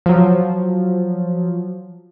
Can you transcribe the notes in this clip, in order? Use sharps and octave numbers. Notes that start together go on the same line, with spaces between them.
F3 F#3